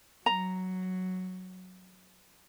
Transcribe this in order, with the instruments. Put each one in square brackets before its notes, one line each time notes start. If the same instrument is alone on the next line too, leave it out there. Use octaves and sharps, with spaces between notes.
[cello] F#3 [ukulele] A#5